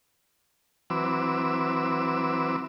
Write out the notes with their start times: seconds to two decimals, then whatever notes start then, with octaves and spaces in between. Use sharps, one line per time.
0.90 E3 F#3 C4 B4 D6 E6